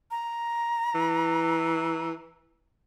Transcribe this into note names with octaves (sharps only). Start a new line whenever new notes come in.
A#5
E3